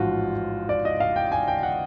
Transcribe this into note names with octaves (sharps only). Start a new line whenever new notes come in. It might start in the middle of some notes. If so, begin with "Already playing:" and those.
Already playing: A1 G#2 F3 F4 F#4
D5
D#5
F5
G5
G#5
G5
F#5